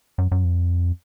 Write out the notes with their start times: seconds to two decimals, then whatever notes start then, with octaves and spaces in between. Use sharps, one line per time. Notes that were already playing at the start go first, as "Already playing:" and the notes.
0.18 F#2
0.31 F#2
0.45 F2